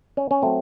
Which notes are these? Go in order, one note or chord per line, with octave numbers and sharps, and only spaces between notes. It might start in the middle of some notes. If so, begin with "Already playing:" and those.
C#4
C#4
F#3 A3 C4